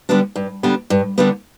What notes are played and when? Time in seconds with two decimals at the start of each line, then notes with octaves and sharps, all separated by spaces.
0.09 D3 G3 B3 D4
0.36 G2
0.63 D3 G3 B3 D4
0.90 G2
1.18 D3 G3 B3 D4